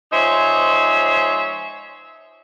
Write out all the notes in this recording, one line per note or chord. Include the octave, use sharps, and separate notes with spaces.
F3 G#3 D#4 C5 C#5 E5